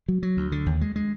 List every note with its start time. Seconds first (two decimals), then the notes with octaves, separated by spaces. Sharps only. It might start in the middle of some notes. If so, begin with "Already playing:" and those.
0.08 F#3
0.23 F#3
0.37 D2
0.52 D3
0.66 D#2
0.81 G#3
0.96 G#3